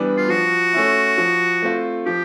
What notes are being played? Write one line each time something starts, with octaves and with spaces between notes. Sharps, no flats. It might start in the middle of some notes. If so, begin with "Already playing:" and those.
Already playing: E3 G3 B3 D4
F4
F3 F#4
A3 C#4 E4
F3
A3 C4 F4
F3 G4